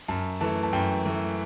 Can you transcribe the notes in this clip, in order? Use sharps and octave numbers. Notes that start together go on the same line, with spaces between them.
F#2 A5
E3 A3 A5
A5
F#2 G5
E3 A3